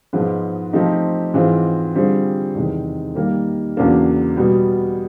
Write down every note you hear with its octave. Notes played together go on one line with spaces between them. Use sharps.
G#2 F3 G#3 B3
F3 A3 C4 D#4 G4
G#2 E3 G#3 C4 F4
D3 G3 C4 F4 G#4
E2 C3 D#3 G#3
D#3 G3 A#3
E2 C#3 F#3 A#3 D4
B2 G3 B3